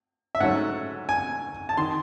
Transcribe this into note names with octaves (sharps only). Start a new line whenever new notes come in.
E5
G#2 F#3 A3 C#4 F#5
G#5
A5
D#3 C6